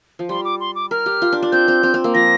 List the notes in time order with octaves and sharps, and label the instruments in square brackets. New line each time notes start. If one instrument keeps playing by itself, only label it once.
[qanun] F3
[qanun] G3 [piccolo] C6
[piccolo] D6
C6
D6
[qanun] A#4 [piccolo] F6
[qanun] G4
F4
D4
D4
[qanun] C4 [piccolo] G6
[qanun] C4
C4
C4
A#3
[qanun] F3 [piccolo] A#6